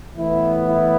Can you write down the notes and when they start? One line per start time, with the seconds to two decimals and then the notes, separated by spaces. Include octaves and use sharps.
0.17 A2 E3 B3 E4
0.65 E4